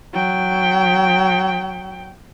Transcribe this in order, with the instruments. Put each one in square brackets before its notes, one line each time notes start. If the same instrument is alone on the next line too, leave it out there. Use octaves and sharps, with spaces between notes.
[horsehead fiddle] F#3 G5